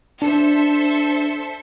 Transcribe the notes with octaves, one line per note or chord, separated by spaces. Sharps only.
D4 A4 C5 E5